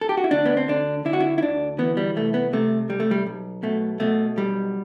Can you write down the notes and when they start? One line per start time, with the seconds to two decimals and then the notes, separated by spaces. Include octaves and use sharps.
0.01 A4
0.09 G4
0.17 F#4
0.24 E4
0.31 D2 D4
0.46 B3
0.57 C4
0.68 D3 D4
1.05 D3 E4
1.13 F#4
1.20 E4
1.38 E4
1.42 D2 D4
1.78 E3 B3
1.97 G3
2.16 C2 A3
2.34 B3
2.53 C3 A3
2.89 C2 G3
3.00 A3
3.11 G3
3.26 B1
3.63 B2 A3
4.00 B2 A3
4.37 B1 G3